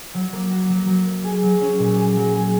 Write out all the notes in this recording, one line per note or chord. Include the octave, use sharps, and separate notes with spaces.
F#3
A#3
F#4
F#3
F#3
A#3
G#4
F#3
C#4
A#2
G#4
F#3
G#4